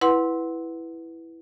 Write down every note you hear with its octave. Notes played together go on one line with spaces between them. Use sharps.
E4 B4 F#5 C6